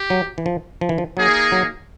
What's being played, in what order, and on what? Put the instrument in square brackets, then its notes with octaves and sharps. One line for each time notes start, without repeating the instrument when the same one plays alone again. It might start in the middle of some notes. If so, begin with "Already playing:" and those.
Already playing: [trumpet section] G4
[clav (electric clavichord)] F#3
E3
F3
F3
E3
F3
[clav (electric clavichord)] F#3 [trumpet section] A#3 D#4 G#4
[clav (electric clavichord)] F#3